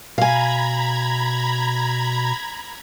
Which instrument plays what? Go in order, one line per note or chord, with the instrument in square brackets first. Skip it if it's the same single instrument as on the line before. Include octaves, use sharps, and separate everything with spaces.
[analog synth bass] B2 [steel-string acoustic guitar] F5 G#5 [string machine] A#5 B5 G#6